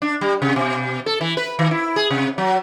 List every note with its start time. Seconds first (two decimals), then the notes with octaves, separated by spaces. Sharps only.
0.02 D4
0.21 G3
0.42 C3
0.56 B2
1.06 A4
1.21 E3
1.37 B4
1.59 D#3
1.71 E4
1.96 G#4
2.10 C3
2.38 F#3